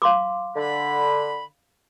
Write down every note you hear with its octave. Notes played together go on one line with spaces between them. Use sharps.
F5 C6 D6
D3 B5